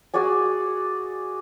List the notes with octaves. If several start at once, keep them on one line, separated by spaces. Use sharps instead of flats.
F#4 G#4 D5 G#5